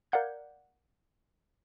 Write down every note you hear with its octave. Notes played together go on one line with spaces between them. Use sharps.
A#4 D5 F5 F#5 G6 G#6